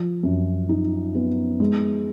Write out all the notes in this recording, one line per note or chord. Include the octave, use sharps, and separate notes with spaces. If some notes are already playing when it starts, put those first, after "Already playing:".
Already playing: F3
F#2
D#4
B3
G#3